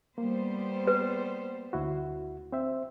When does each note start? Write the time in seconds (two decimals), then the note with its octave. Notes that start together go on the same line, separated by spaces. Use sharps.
0.18 G3 A#3 B3 C5
0.87 B4
1.73 D2 E4 F#4
2.52 C4 C5 E5